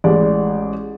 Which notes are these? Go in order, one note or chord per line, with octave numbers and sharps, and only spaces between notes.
A1 G#3 D5